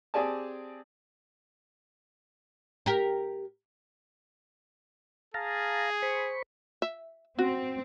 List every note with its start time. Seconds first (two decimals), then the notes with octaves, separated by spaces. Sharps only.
0.14 C4 G4 G#4 D5 G#5 A5
2.86 G4 A#4
5.34 G#4 F5 A5 A#5
6.02 C5 B5 C#6
6.82 E5
7.39 C4 F#4